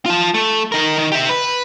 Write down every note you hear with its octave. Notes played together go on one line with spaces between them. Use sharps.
F4 A5
A3
D#3 A#4
D#3
G4 E5
B4